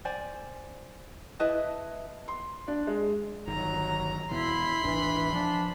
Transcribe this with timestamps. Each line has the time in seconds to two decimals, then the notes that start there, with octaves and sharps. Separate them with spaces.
0.05 C5 D5 G#5
1.40 E4 B4 D#5 A5
2.28 C6
2.68 D4
2.87 G#3
3.47 G1 D#3 F#3 A#5
4.31 E1 B2 E3 E4 B5 C6
4.83 D#1 G#1 E3 D4
5.33 F3 D4